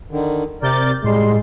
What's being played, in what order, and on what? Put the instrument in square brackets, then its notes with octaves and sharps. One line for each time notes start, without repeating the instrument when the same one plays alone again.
[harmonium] D3 D#3
[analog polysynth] C3 G6 A6 [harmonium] A#4 D5
[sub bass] A2 [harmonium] G3 [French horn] G#3 [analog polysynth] C6